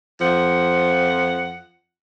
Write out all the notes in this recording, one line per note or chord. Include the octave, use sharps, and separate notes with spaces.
F2 F3 F#5